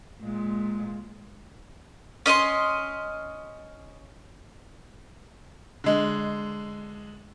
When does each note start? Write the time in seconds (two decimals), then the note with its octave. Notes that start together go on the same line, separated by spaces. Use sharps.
0.22 A#2 G#3
2.26 C#4 D#5 B5 C6
5.84 D3 G#3